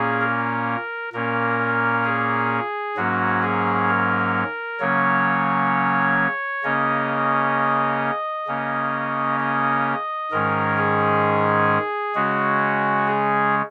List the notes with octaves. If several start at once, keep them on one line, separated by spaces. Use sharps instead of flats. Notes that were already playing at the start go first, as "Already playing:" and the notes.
Already playing: A#2 A#3 C#4 G#4
A#4
A#2 A#3 C#4 A#4
G#4
G#2 F#3 A#3 C#4 F#4
G#4
A#4
C#3 F#3 A#3 C#4 C#5
C#3 A#3 C#4 D#5
C#3 A#3 C#4
D#5
G#2 D#3 G#3 C#4 A#4
G#4
C#3 G#3 C#4 F#4
G#4